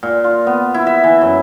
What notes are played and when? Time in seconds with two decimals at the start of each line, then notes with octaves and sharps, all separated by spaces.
0.03 A#2
0.24 F4
0.47 B3
0.74 E4
0.87 E5
1.04 E3
1.22 F#2